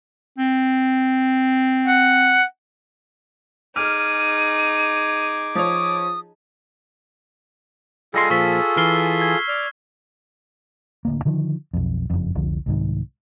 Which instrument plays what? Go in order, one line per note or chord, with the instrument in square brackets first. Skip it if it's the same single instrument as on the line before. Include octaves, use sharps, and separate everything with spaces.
[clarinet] C4
[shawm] F#5
[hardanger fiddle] D#4 G#4 [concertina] D6 [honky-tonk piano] F6 [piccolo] D#7
[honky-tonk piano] F3 C#5 [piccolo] D#6
[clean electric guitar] G3 D#5 C6 [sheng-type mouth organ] F4 G#4 A4
[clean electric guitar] A#2 F3 [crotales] C#6 E6 B6
[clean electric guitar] E3 [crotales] F6 C7 G7
[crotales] G#6
[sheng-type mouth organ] D5 F6
[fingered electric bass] D1 D2 A#3
D3 D#3 F3
B1 F2
F#1 F2
F1 C2 D3 F3
C2 G#2 D#3